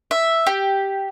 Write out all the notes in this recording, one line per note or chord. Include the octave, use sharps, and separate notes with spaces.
E5
G4